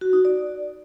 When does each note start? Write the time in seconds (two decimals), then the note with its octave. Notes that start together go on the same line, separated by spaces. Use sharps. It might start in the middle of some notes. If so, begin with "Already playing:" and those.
0.01 F#4
0.13 D#4
0.25 D5